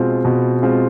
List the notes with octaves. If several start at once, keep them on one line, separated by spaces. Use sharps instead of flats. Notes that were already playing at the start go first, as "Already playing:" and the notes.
Already playing: B2 G#3 C4 F4
B2
G#3 C4 F4